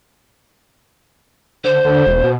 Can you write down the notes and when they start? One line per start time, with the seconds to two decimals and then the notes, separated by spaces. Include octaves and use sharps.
1.64 D3 C5
1.84 D3
2.07 E1
2.24 B2